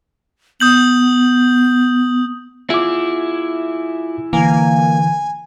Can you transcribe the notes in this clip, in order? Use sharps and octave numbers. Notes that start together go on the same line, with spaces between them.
B3 D#6 G6 F#7
E4 F4 G#4 D6
D3 E3 A#3 G#5